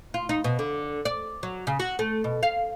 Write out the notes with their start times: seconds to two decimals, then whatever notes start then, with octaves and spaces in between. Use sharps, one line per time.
0.14 F4
0.29 D#4
0.44 B2
0.59 D3
1.05 D5
1.43 F#3
1.67 C#3
1.80 F#4
1.99 A3
2.24 B2
2.43 F5